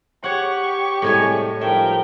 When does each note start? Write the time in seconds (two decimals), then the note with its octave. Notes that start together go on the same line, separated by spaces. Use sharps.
0.24 G4 C#5 F#5 C#6
1.02 C2 A2 G#3 C#5 G#5
1.61 G#2 F3 G3 A#4 E5 G5